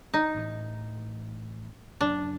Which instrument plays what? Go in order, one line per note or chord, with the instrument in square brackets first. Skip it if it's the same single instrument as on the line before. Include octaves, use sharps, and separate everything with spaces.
[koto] D#4
[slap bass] A1 A2 E3
[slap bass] F#1 F#2 C#3 [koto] D4